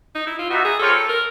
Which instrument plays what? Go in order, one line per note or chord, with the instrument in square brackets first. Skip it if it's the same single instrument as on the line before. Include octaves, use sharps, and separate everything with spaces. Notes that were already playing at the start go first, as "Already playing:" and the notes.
[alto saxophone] D#4
E4
F4
[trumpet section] B3 D#4 G4 B4 E5 [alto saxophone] F#4
[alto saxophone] G#4
[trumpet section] G3 C4 F4 A#4 C#5 [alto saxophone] A4
[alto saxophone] A#4